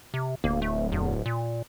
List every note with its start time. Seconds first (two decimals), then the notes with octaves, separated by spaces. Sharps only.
0.14 C3
0.44 D1 A#3
0.62 A3
0.92 E2
1.26 A#2